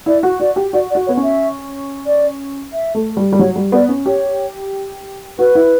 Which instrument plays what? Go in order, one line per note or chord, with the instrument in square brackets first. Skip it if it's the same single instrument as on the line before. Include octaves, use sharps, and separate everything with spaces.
[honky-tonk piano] E4 [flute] D5
[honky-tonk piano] F#4
[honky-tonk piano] F#4 [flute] D5
[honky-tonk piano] G4
[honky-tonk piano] F#4 [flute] D5
[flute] D5
[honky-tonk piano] F#4
[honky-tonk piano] B3 [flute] C#5
[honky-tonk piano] C#4
[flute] E5
D5
E5
[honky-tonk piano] A3
G3
G3
[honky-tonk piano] F#3 [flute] C#5
[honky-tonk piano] G3
[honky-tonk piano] B3 [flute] D5
[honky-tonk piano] C#4
[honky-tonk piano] G4 [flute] C#5
[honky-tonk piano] F#4 [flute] B4
[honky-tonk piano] E4